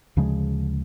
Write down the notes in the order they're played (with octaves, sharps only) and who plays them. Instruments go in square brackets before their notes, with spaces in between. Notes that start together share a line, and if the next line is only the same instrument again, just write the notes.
[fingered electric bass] D2 C#3 F3 G#3